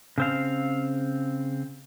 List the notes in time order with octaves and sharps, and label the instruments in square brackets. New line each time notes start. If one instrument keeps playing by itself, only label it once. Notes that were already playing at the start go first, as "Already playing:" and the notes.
[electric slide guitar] C#3 C4 F5